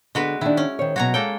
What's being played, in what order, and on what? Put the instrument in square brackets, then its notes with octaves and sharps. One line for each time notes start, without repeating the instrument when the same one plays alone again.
[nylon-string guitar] D3 B3 [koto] G#3 F#4 B4
[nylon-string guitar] D#3 D4 [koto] E4
[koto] C#4
[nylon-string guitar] D#3 C5 C#5
[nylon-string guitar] B2 F#3 [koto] F#4 C#5 A#5
[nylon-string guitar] G#3 C#5 [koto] A#3 A4 G5